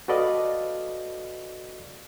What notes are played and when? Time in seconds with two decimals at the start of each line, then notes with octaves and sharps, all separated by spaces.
0.08 F#4 A4 B4 D5 D#5 F5